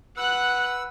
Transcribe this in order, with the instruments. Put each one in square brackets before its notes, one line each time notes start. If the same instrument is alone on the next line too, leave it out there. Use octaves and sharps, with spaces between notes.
[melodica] B4 E6 [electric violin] F#5 F#6